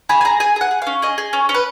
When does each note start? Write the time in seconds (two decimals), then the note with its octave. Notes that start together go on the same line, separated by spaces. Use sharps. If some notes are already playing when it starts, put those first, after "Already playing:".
0.09 G#4 B5
0.21 G#5
0.25 G#4 A#5
0.40 G#4 G#5
0.56 G#4 F#5
0.71 G#4
0.82 C#4 F5
1.02 G#4 D#5
1.18 G#4
1.33 C#4
1.49 C#4
1.54 B4